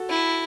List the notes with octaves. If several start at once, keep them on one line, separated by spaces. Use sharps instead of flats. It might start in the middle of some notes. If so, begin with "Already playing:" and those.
Already playing: F#4 A4
E4